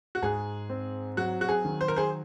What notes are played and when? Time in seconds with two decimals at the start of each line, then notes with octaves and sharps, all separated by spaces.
0.15 F#4
0.22 G#2 G#4
0.70 C4
1.17 F#3 F#4
1.41 F#4
1.49 G#4
1.65 D#3
1.81 C5
1.88 A#4
1.96 G#4 C5